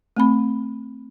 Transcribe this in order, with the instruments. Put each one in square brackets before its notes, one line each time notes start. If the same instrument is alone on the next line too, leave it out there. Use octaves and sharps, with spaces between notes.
[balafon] A3 C4 B5